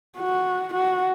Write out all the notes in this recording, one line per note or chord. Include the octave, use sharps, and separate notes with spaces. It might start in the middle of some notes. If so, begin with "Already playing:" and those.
F#4
F#4